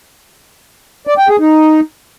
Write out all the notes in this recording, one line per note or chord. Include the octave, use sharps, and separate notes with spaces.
D5
G5
G#4
D#4